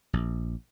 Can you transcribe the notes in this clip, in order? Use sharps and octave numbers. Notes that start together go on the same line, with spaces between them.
A#1